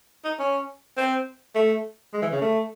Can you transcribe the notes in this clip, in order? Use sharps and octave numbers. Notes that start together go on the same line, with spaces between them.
D#4
C#4
C4
A3
G#3
E3
C#3
A3